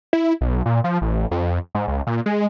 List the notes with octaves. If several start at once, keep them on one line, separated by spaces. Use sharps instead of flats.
E4
B1
A#2
F3
A1
F2
G#2
C#2
A#2
G#3